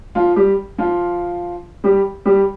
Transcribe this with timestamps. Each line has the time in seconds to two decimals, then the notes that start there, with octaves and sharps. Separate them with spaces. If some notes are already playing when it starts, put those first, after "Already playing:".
0.15 F3 F4
0.36 G3 G4
0.78 F3 F4
1.84 G3 G4
2.25 G3 G4